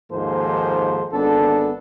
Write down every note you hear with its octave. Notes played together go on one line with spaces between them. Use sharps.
D#2 G#2 F3 A#3 A4 C5
G#1 B3 D4 A4